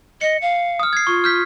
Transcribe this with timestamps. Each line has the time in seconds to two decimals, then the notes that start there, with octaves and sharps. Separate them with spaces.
0.21 D#5 C#7
0.42 F5
0.79 D#6 F6
0.93 G#6 C7
1.07 F4 C#6
1.24 F6 G6 B6